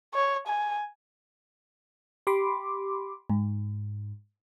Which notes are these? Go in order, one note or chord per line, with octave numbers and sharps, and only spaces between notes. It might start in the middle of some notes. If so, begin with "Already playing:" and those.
C#5
G#5
G4 B5 C6 D6
G#2